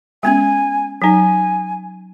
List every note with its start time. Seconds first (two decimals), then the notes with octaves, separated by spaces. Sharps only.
0.23 G#3 B3 C#4 G#5
1.02 F#3 D#4 G#5